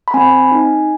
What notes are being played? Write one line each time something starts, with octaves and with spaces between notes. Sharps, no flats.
B5
C4 G#5
D#4